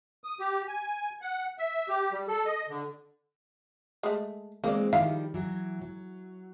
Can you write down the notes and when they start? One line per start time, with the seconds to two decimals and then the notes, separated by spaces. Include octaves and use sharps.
0.24 D#6
0.39 G4
0.68 G#5
1.21 F#5
1.58 E5
1.88 G4
2.12 G3
2.28 A4
2.45 D#5
2.69 D3
4.03 G#3 A3
4.64 E3 G#3 A#3 C4 D5
4.93 D#3 F3 G3 E4 F5
5.34 E3 F#3
5.82 F#3